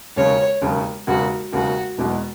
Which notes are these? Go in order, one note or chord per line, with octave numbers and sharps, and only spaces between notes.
E1 D#2 C#3 C#5
E1 D#2 C#3
E1 D#2 C#3 F#4
E1 D#2 C#3 F#4
E1 E2 B2 G#3